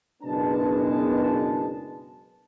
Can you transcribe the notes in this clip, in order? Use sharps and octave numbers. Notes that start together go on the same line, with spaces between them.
F#1 B2 G#3 B3 D4 A5